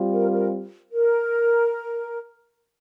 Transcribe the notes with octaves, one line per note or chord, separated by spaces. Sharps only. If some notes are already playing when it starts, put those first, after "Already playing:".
Already playing: G3 C4 F4
A#4
A#4
A#4